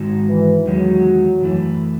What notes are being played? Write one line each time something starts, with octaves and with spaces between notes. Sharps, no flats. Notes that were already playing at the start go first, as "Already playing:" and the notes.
Already playing: G#2 D#3 G#3 D#4 F#4
E3
E2 D#3 F#3 G#3
F#2 E3 A3 E4